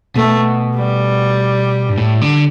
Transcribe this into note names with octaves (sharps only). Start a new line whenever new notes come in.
B2 A3
G3
G2
A2
D3